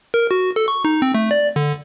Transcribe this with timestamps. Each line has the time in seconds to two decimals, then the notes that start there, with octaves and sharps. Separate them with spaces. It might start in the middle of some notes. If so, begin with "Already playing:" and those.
0.14 A#4
0.31 F#4
0.56 A4
0.68 C#6
0.85 D#4
1.02 C4
1.15 A3
1.31 D5
1.56 D3